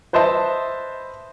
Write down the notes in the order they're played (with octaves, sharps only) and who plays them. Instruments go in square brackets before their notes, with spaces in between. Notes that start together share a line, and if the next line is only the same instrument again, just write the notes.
[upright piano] B4 C5 D#5 E5 A5 C6